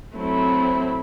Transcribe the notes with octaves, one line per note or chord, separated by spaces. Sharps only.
F#3 A3 C4 E4